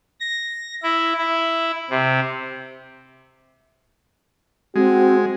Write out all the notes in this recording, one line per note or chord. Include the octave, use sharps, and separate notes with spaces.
A#6
E4
E4
C3
G#3 C4 F#4